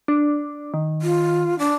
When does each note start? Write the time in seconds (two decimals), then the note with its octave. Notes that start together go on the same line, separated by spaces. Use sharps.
0.08 D4
0.74 D#3
1.02 F4
1.59 D4